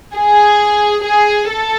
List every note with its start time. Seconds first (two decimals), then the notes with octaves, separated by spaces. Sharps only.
0.15 G#4
1.04 G#4
1.49 A4